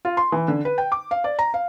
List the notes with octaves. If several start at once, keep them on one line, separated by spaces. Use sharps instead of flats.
F4
C6
E3
D3
B4
G5
D6
F5
D5
A#5
F5